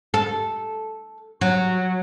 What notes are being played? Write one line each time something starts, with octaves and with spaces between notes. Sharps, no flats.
A4
F#3